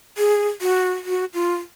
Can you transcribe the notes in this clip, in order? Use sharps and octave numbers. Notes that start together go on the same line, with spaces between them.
G#4
F#4
F#4
F4